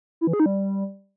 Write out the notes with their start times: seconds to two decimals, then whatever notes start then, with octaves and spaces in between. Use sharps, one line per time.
0.21 E4
0.27 E3
0.33 G#4
0.40 D#4
0.46 G3